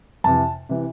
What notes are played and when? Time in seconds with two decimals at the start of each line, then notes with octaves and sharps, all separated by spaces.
0.24 F2 C3 E3 A5
0.69 C3 E3